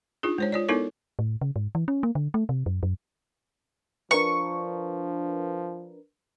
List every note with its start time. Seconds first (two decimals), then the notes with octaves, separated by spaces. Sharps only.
0.23 D4 D#4 F4 G#4
0.38 G#3 C5 C#5
0.52 F4 C#5 D5
0.68 B3 D#4 E4 A4 A#4 C#5
1.19 A2
1.41 C#3
1.56 G#2
1.75 E3
1.88 C#4
2.03 A#3
2.15 D3
2.34 A3
2.49 C3
2.66 F#2
2.83 F#2
4.11 F3 D4 A#4 B4 C#6